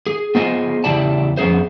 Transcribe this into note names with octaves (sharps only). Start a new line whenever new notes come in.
G#4
B3 F4 G#4 C5 D#5 G#5
E2 C#3 E4 G4 D5 A5
F2 B3 C#4 G#4 C5